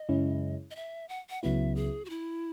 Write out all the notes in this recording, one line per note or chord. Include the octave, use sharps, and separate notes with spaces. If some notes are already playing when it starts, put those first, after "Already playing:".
Already playing: D#5
F#2 C#3 G#3 C#4 E4
D#5
E5
F#5
F#5
C#2 C#3 F#3 B3 E4 E5
G#4
F#4
E4